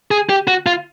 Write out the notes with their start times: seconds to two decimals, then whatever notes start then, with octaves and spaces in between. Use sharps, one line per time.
0.11 G#4
0.29 G4
0.47 F#4
0.66 F4